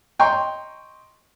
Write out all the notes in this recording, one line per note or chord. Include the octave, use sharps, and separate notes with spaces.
D#5 G5 A#5 C6 C#6